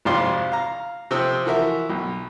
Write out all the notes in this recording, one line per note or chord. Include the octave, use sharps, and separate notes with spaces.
G#1 F2 C3 F4 D5 C6
F5 A#5
C3 F3 C4 D#6 E6
E3 F3 F#4 A#4 E5
B1